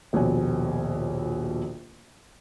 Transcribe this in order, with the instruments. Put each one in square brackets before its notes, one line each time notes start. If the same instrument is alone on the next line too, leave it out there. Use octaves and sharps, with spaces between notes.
[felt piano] D#1 A#1 B2 C#5 G#5